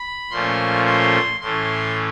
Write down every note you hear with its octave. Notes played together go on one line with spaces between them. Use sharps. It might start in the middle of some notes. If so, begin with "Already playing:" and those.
Already playing: B5
A#2 F3 A3 C#4 C6
C6
A2 E3 A3 C#4 C6